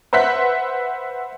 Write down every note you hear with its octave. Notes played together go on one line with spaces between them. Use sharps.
B4 C5 E5 F#5 B6